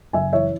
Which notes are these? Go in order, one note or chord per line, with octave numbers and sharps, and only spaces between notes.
F#1 E5 G#5
E3 C#5 E5